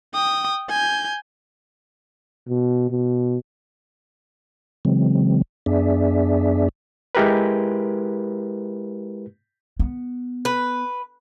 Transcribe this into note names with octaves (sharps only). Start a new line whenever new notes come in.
G5 D#6
G#5 G6
B2
B2
C#3 E3 F#3 G#3 C4
F#2 B3 D4 G#4 D5 E5
G#3 E4 G4 A#4 B4
B3
B4